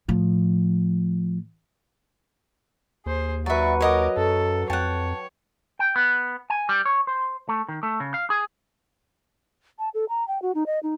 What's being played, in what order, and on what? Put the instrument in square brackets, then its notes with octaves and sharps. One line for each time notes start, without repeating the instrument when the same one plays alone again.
[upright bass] A2 F3
[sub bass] D#2 [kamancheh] G#4 C5
[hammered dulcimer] F#3 B4 [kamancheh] F#4 C#6 [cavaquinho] D5 E5
[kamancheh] A#4 D6 [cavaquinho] C#5 D#5 F#5
[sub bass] F#2 [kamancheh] A4
[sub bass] F2 [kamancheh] C#5 [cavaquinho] F#5 A5 [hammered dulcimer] G5
[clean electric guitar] G5
B3
G#5
G3
C#5
C5
A3
D#3
A3
C#3
F5
G#4
[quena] A5
A4
A#5
G5
F#4
D#4
D#5
D#4